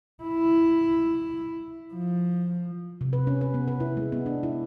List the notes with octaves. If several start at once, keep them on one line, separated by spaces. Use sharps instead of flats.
E4
F3
C3
B4
C#4
B4
B3
B4
E4
G#3
B3
D4
E4